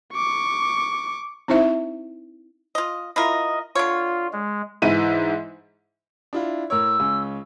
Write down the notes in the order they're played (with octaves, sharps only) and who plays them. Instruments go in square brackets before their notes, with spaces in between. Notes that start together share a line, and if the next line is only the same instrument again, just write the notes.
[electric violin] C#6 D6
[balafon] C4 D#4 E4 C5 E5
[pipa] F4 D#5
[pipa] E4 F4 A#4 [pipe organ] D#5
[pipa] D3 C#5 [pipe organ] F4
[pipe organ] G#3
[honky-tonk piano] G#2 E3 E4 E5 D#7
[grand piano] D4 E4 F4
[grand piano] A2 A#4 C#5 [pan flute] E6
[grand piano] C#2 C#4